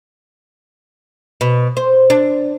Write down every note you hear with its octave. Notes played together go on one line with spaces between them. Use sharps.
B2
C5
D4